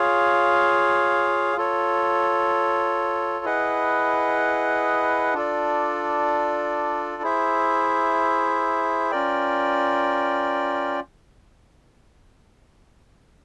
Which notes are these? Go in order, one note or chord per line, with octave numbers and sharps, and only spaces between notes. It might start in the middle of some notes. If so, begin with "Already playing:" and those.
Already playing: F4 G#4 C#5 F5
F4 A4 C#5
E4 G#4 B4 D#5 F#5
D4 F4 A4 D5
E4 G#4 C5 E5
C#4 F4 A#4 D5 G5